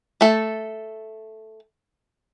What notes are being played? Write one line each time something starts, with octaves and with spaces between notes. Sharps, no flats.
A3 A4